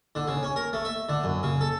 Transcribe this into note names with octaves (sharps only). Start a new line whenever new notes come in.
D3
C#3
C#4
A#4
A3
E5
D3
F#2
C#3
A4